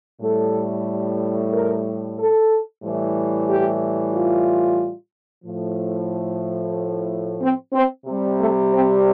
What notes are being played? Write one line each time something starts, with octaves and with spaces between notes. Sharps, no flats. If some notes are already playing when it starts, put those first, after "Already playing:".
A2 G3 A4
A#4
A4
A2 E3 G3
G4
F4
A2 F3
C4
C4
C3 G3
A3
C4